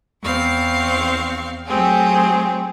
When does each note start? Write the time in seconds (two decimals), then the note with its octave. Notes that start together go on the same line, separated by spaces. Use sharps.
0.23 E2 C4 F5 C#6
1.67 F#3 A3 C4 G4 G#4